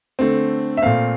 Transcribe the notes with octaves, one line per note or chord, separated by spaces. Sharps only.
D3 A3 C4
E5
A#2 A3 C4 F5